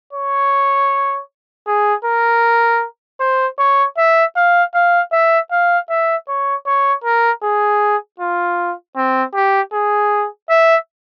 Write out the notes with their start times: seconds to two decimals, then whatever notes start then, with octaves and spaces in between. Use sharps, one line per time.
0.13 C#5
1.67 G#4
2.05 A#4
3.20 C5
3.58 C#5
3.98 E5
4.36 F5
4.75 F5
5.12 E5
5.51 F5
5.89 E5
6.28 C#5
6.66 C#5
7.04 A#4
7.43 G#4
8.20 F4
8.96 C4
9.34 G4
9.73 G#4
10.49 E5